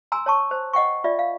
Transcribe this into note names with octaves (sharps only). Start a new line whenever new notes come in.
G#5 A#5 C6 E6
C#5 A5 C#6
C5
D#5 F#5 G5 C#6
F4 D5 E5
F5